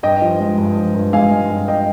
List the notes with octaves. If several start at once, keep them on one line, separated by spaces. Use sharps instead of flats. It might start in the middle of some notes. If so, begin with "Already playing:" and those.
G2 D#5 G5
F3
G#3
G2
F3
G2
G#3 F5 G#5
G#3
G2
D#5 G5